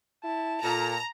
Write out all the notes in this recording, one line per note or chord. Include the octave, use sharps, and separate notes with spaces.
E4 A5
A#2 A4 A#5